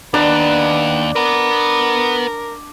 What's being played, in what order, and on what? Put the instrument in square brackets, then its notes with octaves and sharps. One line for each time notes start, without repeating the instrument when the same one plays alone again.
[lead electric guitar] D#2 [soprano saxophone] B3 [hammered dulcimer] D4 D5
[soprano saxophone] A#4 [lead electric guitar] B4 F#5